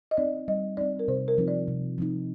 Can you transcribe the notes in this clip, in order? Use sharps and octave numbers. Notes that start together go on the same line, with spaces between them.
D#5
C4 D#4 D5
G3 D#5
C4 D#4 D5
A#4
C3 C5
A#4
F3 C4 D#4
D5
C3
F3 C4 D#4